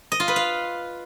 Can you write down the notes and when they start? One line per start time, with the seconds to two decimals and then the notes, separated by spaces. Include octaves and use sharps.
0.12 D#5
0.20 F4
0.28 B4
0.36 F5